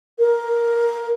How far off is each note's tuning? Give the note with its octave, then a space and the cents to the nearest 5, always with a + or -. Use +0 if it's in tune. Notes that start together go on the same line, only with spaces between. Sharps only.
A#4 +10